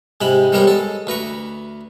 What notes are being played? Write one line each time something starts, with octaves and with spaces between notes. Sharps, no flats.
G#2 C3 G#3 B5
G3 G#3 B3 A#4 C5 C#5
G#3 A4
D2 B4 A#5 C#6